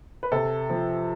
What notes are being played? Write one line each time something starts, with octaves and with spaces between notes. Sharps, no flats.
B4
C3 A4
F3